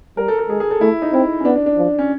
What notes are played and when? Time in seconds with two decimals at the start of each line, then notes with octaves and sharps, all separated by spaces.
0.17 G3 A#4
0.28 A4
0.39 A4
0.49 G#3 G#4
0.60 G#4
0.71 A4
0.81 A3 E4
1.02 D#4
1.13 C4 E4
1.40 C#4
1.45 B3 D4
1.56 D4
1.66 D4
1.77 F3
1.98 C#4